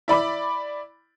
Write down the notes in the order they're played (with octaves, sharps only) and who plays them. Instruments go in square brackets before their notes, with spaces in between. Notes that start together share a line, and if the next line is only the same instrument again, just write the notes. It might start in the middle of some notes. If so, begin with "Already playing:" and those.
[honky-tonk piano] E4 D5 B5 D6